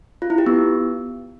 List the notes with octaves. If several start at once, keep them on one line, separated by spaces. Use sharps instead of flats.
F4
E4
G4
B3